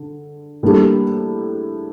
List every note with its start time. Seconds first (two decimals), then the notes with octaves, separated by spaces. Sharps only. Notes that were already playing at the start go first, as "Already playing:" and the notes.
Already playing: D3
0.63 A2 G3 A#3 D4 G4